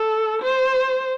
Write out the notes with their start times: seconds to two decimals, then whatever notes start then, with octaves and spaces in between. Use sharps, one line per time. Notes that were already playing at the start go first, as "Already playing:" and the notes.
Already playing: A4
0.42 C5